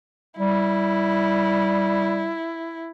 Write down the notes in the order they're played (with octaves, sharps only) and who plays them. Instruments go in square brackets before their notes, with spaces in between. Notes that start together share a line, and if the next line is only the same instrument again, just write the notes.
[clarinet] G3 [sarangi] E4